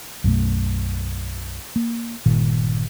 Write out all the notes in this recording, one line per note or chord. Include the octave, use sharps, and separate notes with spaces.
B1 F#2 B2 A3
A#3
G1 A#2 D#3